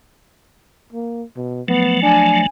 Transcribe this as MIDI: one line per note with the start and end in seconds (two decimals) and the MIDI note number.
0.93 1.23 58
1.36 1.62 47
1.68 2.46 53
1.68 2.46 54
1.68 2.46 57
1.68 1.98 59
2.03 2.43 62
2.03 2.45 80